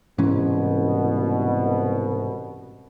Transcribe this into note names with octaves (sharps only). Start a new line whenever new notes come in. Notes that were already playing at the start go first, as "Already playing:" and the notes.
C2 G#2 B2 E3 C#4